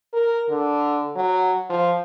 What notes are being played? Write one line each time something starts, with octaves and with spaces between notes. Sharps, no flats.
A#4
D3
F#3
F3